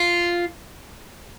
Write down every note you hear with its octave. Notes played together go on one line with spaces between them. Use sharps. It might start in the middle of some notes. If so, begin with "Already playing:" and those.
Already playing: F4